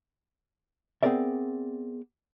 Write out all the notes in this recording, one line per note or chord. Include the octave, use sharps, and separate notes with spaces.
B3 C4 G#4 A#4 D5 E5